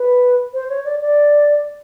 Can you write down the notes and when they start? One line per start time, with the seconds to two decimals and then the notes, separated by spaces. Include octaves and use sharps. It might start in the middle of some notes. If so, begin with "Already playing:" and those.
Already playing: B4
0.54 C5
0.70 C#5
0.85 D5
1.00 D5